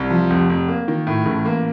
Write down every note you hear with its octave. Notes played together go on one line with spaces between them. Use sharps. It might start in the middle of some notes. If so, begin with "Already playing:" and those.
Already playing: C2
F3
F1
F1
A#3
D#3
A2
A1
A#3